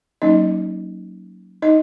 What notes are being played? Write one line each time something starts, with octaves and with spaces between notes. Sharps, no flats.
F#3 A#3 C#4 D#4 D#5
D#4 D#5